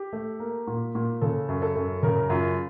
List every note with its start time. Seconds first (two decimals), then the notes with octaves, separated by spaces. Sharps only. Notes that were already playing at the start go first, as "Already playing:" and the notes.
Already playing: G4
0.13 A3
0.40 A#3
0.67 A#2
0.95 A#2
1.21 C#3 A4
1.49 F#2
1.62 A4
1.76 F#2
2.03 C#3 A#4
2.30 F#2 F4